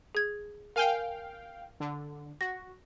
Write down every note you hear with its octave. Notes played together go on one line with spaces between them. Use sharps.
G#4 G#6
A#4 F5 G5 G#5 G7
D3
F#4 A#6